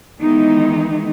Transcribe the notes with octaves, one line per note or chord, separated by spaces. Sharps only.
D#3 E3 G#3 B3 D#4